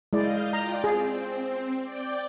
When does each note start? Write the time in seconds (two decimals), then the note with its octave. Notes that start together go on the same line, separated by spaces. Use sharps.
0.13 G#3 E4 D5 D#5 F5 G6
0.53 F4 D5 G5 A#5
0.84 C4 G#4
1.83 D5 G5 D6